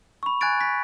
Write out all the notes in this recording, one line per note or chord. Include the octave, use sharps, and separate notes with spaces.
B5 C#6
G#5 F#6 G#6 A6 D7
B6